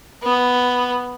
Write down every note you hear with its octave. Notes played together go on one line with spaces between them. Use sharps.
B3